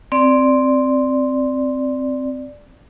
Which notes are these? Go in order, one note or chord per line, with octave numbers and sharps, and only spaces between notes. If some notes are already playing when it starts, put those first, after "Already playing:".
C4 D5